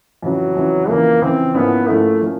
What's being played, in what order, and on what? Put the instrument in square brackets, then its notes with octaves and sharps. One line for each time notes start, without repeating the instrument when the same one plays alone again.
[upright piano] F2 C#3 E3 [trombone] F#3
[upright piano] F2 C#3 E3
[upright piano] F2 C#3 E3 [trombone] A#3
[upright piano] F2 C#3 E3 [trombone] C4
[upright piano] G#2 F3 A#3 C#4 E4 [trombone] B3
[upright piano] G#2 F3 A#3 C#4 E4 [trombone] A3
[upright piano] F3 A#3 C#4